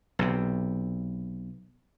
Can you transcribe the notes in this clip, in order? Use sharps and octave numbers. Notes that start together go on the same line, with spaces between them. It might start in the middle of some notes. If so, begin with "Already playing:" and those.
B1 C3